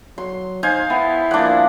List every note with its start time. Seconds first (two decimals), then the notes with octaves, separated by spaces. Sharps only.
0.18 F#3 C6
0.63 D#4 C5 F5 G#5
0.90 B3 E4
1.31 F3 A#3 D4 F#5